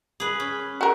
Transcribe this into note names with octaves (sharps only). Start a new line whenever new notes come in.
G#4 B4
C#4
F#4 A#4